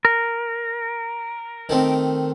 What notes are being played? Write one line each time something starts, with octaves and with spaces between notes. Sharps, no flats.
A#4
D#3 A3 C4